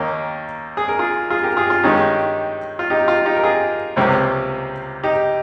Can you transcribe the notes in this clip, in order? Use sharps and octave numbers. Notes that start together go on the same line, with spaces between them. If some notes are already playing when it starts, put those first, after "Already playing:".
Already playing: D#2 D#3 A#3 C#4 D#4
G#4
A#4
F4 G#4
F4 G#4
G4 A#4
F4 G#4
F4
G2 D#3 G#3 C#4 D#4 G4
F4
D#4 G4
F4
D#4 G4
A#4
F4 G#4
C#2 C3 G3 A#3 C#4
D#4 G4